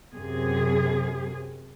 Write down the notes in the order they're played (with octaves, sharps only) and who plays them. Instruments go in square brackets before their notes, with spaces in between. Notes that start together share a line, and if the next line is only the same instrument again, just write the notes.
[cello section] F#2 C3 G#4